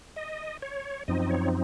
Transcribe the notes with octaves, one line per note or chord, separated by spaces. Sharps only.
D#5
C#5
F#2 F3 C4 D#4 D#5
D#5
C#5